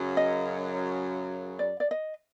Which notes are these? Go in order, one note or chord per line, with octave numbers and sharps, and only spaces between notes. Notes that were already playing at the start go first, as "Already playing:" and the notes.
Already playing: F#2 C#3 F#3
D#5
D5
D5
D#5